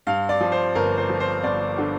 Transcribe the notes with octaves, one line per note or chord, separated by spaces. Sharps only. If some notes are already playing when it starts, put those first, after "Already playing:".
G2 F5
D5
F3
C5
G1 A#4
C5
F3
C5
G1 D5
D3